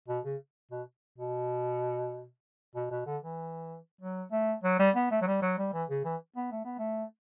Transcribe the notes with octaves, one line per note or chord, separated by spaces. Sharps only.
B2
C#3
B2
B2
B2
B2
D3
E3
F#3
A3
F#3
G3
B3
A3
F#3
G3
F#3
G3
E3
C#3
E3
B3
A3
B3
A3